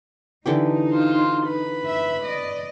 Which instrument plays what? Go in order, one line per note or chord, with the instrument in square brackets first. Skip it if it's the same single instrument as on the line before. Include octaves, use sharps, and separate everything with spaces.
[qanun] D3 E3 G4 [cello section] D#4
[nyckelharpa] F4 C5
B4 B5
[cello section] E5
D5 D#5